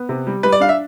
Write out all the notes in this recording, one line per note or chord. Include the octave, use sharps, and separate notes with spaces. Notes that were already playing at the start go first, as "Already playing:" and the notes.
Already playing: B3
C3
G3
G3 B4
D5
D4 F5
E5